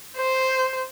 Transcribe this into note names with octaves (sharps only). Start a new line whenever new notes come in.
C5